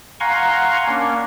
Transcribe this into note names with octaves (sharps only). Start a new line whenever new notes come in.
F5 F#5 G#5 A#5 C6 C#6
A#3 C#4 D4